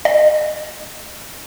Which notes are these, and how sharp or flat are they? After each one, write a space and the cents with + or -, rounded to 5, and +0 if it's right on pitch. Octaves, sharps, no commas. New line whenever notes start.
D#5 -40